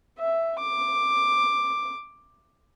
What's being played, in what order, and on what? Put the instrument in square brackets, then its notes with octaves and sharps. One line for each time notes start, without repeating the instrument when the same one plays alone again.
[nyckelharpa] E5
D6